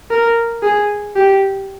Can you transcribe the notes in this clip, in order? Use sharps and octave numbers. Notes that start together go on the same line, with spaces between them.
A#4
G#4
G4